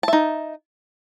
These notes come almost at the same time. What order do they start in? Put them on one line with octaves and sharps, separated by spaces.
A5 E5 D#4